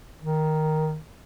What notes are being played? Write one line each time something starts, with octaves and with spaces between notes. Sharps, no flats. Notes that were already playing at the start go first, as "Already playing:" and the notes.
D#3